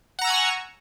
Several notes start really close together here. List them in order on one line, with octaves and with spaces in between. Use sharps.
F#5 A#5 E6 G#5 C#6